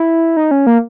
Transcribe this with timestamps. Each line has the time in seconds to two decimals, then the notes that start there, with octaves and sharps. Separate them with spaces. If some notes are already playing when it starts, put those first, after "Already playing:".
Already playing: E4
0.37 D#4
0.51 C#4
0.67 A#3